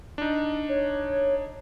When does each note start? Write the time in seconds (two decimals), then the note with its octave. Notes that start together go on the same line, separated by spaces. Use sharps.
0.18 D4 D#4
0.69 C#5